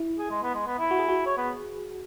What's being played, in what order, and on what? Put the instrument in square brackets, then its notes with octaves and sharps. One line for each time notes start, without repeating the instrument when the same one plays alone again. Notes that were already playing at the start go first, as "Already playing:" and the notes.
Already playing: [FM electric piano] E4
[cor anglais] G#4
G#3
B3
G#3
B3
E4
[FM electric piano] F#4
G#4
F#4
[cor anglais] C#5
B3